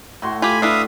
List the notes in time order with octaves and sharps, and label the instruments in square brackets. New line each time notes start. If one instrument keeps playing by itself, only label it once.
[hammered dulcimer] A2 F#4 C6
[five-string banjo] F4 G4 [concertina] G#5 B5
[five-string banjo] D4 E4 B4 [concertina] E5 F5 D#6